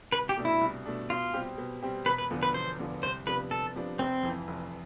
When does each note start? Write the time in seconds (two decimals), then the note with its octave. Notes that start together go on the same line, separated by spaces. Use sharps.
0.12 C2 B4
0.29 G4
0.37 B2 A3 D4
0.45 E4
0.61 C2
0.86 B2 A3 D4
1.10 B2 F4
1.34 G3 C4 G4
1.58 B2
1.83 G3 C4 G4
2.06 E1 B4
2.18 B4
2.31 E2 D3 F3 B3
2.43 B4
2.54 E1 C5
2.79 E2 D3 F3 B3
3.03 C2 C5
3.27 C3 F3 B3 D4 B4
3.51 C2 A4
3.76 C3 F3 B3 D4
3.99 F1 C4
4.23 F2 E3
4.48 F1